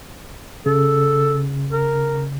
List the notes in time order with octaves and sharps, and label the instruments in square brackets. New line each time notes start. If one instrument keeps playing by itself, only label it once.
[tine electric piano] C#3 [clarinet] A4
[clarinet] A#4